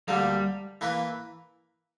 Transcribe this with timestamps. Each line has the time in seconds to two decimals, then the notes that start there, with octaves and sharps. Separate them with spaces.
0.08 D2 D3 G3 A#3
0.81 E3 A#3 E4 B4